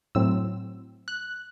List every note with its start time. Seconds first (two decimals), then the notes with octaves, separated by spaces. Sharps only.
0.15 A2 F#3 C4 E6
1.08 F#6